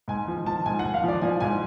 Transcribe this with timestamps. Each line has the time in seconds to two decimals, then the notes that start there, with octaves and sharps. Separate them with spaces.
0.08 G#2 G#5
0.28 F3
0.46 F3 A5
0.66 G#2 G#5
0.79 F#5
0.84 G#2
0.94 F5
1.04 F3 D5
1.21 F3 G#5
1.40 G#2 G#5